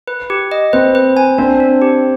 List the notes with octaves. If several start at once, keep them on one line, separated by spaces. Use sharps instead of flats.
B4
G4
D#5
C4 B4
B4
G#5
C4 D4
D4
G4